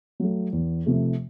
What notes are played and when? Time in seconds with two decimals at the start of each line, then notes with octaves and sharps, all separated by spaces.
0.20 F#3 A3
0.53 E2
0.86 C3 F3 A3